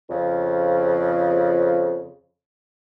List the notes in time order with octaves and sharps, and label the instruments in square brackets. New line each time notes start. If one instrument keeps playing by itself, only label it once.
[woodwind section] F2 C#3